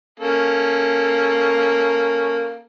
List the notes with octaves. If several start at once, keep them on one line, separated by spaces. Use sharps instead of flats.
A#3 C#4 A4